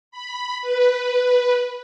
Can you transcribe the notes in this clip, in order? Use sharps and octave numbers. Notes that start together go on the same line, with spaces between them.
B5
B4